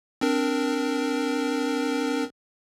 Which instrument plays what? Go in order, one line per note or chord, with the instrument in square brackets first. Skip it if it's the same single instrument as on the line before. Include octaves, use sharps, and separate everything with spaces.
[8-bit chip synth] C4 D4 A#4